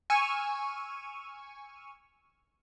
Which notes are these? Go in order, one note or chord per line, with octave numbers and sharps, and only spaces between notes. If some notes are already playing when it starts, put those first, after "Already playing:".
G#5 C#6 E6 F6 D#7